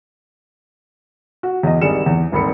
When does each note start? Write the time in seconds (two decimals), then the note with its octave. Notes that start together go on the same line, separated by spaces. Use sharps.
1.43 F#4
1.63 E2 D#5
1.81 G#1 G3 D4 G#4 C#7 E7
2.06 E2
2.32 D#1 G#1 B5 C#7